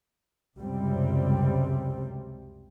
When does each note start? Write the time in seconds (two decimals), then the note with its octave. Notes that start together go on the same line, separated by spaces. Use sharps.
0.59 C#2 F#2 C3 G3 C4